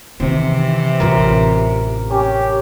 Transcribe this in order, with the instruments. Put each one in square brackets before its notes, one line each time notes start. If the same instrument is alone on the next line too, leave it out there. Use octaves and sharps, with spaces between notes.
[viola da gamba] C3 E3 [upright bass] D#3
[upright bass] A1 F4 [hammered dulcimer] A#4
[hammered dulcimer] C#4 [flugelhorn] G4